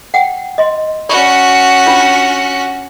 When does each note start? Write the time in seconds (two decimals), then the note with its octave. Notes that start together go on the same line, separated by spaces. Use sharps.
0.14 F#5 G5
0.58 D#5 C6
1.09 C#4 F#4 D5 B5 C#6
1.87 D4 F4 B5